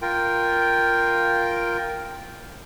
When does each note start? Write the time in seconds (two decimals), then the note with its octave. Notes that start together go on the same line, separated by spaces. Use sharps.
0.02 F4 A#4 G5